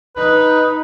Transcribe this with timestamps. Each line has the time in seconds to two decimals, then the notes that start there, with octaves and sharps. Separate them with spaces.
0.16 D#4 B4